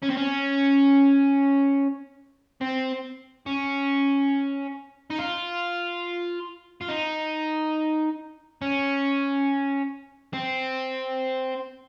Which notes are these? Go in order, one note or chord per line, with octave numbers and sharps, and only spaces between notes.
C#4
C4
C#4
C4
C#4
D#4
F4
F4
D#4
C#4
C4